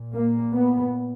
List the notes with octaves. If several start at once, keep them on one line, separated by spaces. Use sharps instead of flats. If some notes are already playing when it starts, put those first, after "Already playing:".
Already playing: A#2
A#3
B3